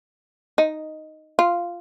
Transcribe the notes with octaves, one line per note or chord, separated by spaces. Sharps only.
D#4
F4